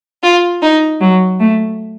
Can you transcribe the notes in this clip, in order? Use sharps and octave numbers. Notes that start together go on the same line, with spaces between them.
F4
D#4
F#3
A3